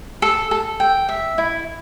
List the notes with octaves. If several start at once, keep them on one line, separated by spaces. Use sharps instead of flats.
A4
A4
G5
E5
E4